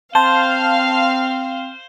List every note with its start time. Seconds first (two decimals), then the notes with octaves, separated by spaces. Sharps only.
0.15 C4 C5 F5 A5 C6